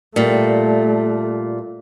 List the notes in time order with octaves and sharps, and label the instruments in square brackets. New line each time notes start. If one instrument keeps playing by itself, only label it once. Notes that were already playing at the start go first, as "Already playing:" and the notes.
[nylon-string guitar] A#2 G3 [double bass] A3